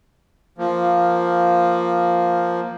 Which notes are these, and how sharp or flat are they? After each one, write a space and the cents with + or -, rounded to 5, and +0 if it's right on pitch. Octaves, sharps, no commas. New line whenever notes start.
F3 +0 A#3 +0